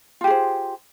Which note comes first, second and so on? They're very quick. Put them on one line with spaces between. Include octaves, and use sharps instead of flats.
F4 G4 G#4 C5